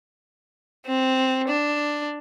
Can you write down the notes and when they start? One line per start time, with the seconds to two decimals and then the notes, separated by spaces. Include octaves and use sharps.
0.86 C4
1.48 D4